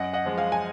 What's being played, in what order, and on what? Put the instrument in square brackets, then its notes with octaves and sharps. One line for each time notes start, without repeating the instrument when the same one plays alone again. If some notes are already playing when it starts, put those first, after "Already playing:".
Already playing: [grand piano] F#2 D#5 F#5
D#5 F#5
F3 G#3
F5 G#5
G#5